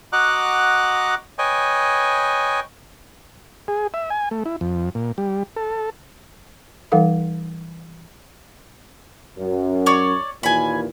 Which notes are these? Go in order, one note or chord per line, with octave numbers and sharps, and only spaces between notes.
F#4 D#5 F#5 A#5 D6 F#6
B4 C#5 D#5 G5 G#5
G#4
E5
G#5
A3
E4
F2
A#2
G3
A4
E3 G3 D#4 A4 F5 F#5
F#2
C#5 D5
D#2 A#2 E3 G#5 B5